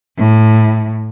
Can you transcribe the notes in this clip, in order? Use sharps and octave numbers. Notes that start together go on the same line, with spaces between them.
A2